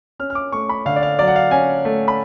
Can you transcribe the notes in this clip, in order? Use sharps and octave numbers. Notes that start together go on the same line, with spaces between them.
C#4 F6
F6
D6
A3 C#6
B5
D3 F5
D5
F5
F#3 D5
F#5
F5
C#4 G#5
A3
B5